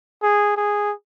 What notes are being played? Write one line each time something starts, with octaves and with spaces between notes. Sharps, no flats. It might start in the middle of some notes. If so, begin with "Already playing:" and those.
G#4
G#4